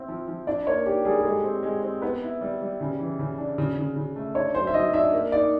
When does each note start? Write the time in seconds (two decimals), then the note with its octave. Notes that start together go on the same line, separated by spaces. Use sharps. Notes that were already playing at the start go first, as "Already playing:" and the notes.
Already playing: C4 E4
0.08 F3
0.28 F3
0.47 D4 D5
0.67 A#3 C#5
0.86 D4 G4
1.05 G3 G#4
1.19 G#4
1.24 G#3 A4
1.44 C4
1.63 G#3
1.83 C4
2.02 B3 B4
2.22 E4
2.41 G3
2.61 G3
2.80 C#3
2.99 E3
3.19 C#3
3.38 D4
3.58 C#3
3.77 C#3
3.96 C#3
4.16 A3
4.35 D4 C#5
4.55 F#3 C5
4.67 E5
4.74 F#3 D#5
4.93 D4 E5
5.13 A#3
5.32 D#4 D5